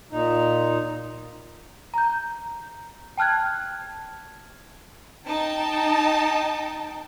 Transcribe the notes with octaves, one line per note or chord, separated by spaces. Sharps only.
A#2 D#4
A#5 G6
G5 A5 F6 F#6 G#6
D#4 G5 A5